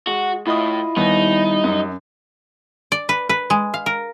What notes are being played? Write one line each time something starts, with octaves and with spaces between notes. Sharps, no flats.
G#3 F#4
A2 E4 F4 D#5 D#6
D#2 G3 B3 D#4
F#2
D5
B4
B4
G#3
F5
A#4